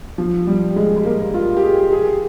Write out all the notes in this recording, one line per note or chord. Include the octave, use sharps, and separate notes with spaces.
F3
G3
G#3
G#3
A#3
F4
G4
G#4
G#4